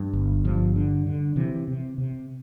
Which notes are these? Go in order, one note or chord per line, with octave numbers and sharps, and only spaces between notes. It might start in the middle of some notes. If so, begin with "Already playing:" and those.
Already playing: G2
G1
G2 F3
D3
D3
C3 E3
C3
C3